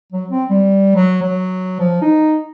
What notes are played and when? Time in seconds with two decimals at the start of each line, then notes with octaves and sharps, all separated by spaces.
0.12 F#3
0.29 C4
0.50 G3
0.95 F#3
1.22 F#3
1.79 F3
2.01 D#4